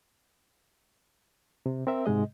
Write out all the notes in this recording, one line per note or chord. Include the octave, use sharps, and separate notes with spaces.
C3
C4 A#4 E5
G#2 C3 G#3 D#5